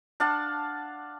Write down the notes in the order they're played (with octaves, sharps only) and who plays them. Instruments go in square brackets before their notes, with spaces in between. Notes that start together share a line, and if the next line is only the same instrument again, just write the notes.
[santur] D4 F5 F#5 A5